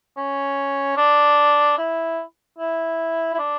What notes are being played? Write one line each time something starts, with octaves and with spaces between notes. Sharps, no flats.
C#4
D4
E4
E4
E4
D4